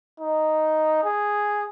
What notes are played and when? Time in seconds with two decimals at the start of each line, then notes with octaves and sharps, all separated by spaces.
0.20 D#4
1.04 G#4